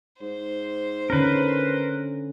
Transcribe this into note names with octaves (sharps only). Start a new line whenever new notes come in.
G#2 C5
D3 C#4 A#4 B4